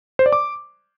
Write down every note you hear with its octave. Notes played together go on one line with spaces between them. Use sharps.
C5
D5
D6